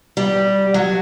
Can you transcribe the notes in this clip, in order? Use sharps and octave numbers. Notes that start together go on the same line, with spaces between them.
G3
F#3